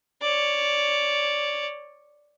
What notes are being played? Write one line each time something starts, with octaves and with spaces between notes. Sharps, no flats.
C#5 D5